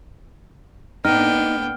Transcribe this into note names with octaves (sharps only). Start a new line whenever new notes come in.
A2 A#3 B3 D4 D#4 G5 F6